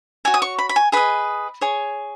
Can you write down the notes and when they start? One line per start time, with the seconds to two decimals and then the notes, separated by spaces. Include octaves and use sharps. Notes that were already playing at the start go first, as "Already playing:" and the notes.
0.25 F#4 C#5 G#5
0.34 D#6
0.42 C#6
0.58 B5
0.69 B5
0.76 G#5
0.92 G#4 B4 D#5 B5
1.61 G#4 C#5